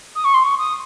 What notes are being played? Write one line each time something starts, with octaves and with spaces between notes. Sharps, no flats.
D#6
C#6
C6
C#6
D#6